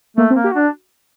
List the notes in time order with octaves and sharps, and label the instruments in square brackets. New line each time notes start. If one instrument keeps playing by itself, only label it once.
[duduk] A3 [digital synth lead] A#3
[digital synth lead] C4
[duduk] A#3
[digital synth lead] G4
[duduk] D4 [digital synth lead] F#4